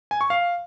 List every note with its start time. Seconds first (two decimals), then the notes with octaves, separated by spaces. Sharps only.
0.11 G#5
0.21 C#6
0.30 F5